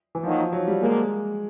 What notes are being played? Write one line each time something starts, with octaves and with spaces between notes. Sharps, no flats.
E3
D#3 F3 F#3 A#3 D#4 F#4
F#3
G3
D3 F3 G#3 A#3